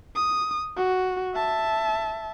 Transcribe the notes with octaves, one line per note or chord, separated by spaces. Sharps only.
D#6
F#4
E5 A5